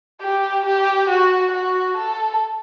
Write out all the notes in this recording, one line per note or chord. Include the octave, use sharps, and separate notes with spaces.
G4
G4
F#4
F#4
A4